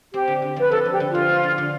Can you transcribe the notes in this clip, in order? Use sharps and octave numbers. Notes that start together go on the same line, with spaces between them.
C4 G4
D3
D3
F3 B4
F3 A4
D3 G4
D3
F3 F4
A3
D3
D3